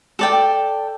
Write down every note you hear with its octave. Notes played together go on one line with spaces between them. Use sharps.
A4 D5 G5